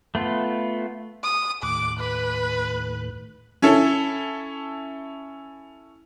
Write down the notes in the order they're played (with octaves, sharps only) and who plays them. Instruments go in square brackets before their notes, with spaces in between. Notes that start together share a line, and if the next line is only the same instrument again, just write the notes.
[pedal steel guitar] A3 B3 F4
[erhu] D#6
[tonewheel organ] D#2 A2 F#6 [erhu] D6
[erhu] B4
[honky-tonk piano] C#4 E4 A4